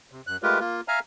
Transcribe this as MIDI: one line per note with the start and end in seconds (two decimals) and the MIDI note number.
0.12 0.21 48
0.27 0.37 42
0.27 0.37 90
0.43 0.59 56
0.43 0.59 57
0.43 0.59 65
0.43 0.59 67
0.43 0.59 70
0.43 0.59 71
0.60 0.81 58
0.60 0.81 65
0.88 0.99 76
0.88 0.99 77
0.88 0.99 80
0.88 0.99 82
0.88 0.99 89